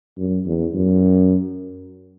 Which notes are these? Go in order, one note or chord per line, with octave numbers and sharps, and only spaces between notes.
F#2
E2
F#2